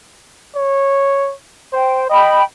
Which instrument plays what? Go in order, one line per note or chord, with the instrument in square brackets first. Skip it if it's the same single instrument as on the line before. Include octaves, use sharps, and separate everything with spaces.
[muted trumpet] C#5
[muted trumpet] C5 [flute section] G5
[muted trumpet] D#5 [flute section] G5 B5